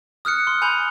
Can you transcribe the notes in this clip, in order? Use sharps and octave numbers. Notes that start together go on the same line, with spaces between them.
D#6 F6 F#6 C#7
C6
G#5 B5 G6 F7